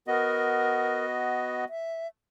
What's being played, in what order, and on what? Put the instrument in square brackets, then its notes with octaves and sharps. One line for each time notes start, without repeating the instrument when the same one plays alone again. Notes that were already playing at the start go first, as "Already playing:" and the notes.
[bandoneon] B3 F#4 D#5 [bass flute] A#4
[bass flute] E5